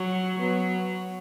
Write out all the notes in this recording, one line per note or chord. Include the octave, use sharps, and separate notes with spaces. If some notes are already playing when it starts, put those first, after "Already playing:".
Already playing: F#3
F#3 B3